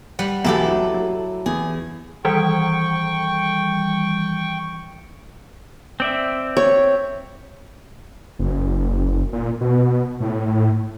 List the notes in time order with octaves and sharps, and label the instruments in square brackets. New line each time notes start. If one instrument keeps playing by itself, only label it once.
[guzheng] G3 F#5
[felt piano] B1 E2 [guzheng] E4 G4 A4
[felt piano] F#3
F#3
[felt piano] E2 [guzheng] G#4
[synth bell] D#3 E3 G3 [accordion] G5 C#6
[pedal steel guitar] C4 D5 E5
[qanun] C#5
[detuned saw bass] F#1
A#2
B2
A2